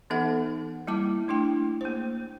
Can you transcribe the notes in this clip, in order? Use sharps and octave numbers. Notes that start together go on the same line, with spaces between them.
E3 B3 D#4 A4 E5 F#5
G3 A#3 E4 A5 D6
A3 D4 E4 G5
A#3 C5